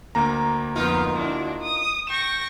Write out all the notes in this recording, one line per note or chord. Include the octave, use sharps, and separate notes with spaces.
D2 A#3 A#5
F2 B3 D#4 F4 A#4
D4 E4 F#4
D#6
G5 C#6 A#6 E7